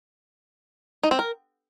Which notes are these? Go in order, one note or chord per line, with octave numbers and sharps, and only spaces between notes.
D#4
C4
A#4